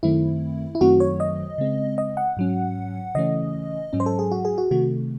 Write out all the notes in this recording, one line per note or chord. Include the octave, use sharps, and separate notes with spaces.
F#2 D#3 A3 C4 E4
E4
F#2 D#3 F#3 A3 C4 F#4
C#5
D#5
C#3 G#3 C4
D#5
F#5
G#2 F#3 C#4
C#3 E3 A3 C#4 D#5
G#2 F#3 C#4
C5
A4
G#4
F#4
G#4
F#4
C3 D#3 A3 F#4